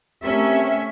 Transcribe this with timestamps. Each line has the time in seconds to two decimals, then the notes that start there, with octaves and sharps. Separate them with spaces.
0.23 A3 C4 C#4 G4 A#4 E5